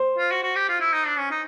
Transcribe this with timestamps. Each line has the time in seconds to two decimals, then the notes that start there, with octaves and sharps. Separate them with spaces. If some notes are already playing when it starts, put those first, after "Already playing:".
Already playing: C5
0.18 F4
0.31 F#4
0.43 F#4
0.55 G4
0.69 F4
0.80 E4
0.93 D#4
1.06 D4
1.18 C#4
1.31 D#4